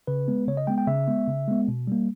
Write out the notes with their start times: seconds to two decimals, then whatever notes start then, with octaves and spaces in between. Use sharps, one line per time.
0.07 C#3 B4
0.28 G#3 B3
0.48 C#3 C#5
0.57 D#5
0.67 G#3 B3 G5
0.78 G5
0.87 C#3 E5
1.08 G#3 B3
1.28 C#3
1.48 G#3 B3
1.68 B2
1.87 G3 A#3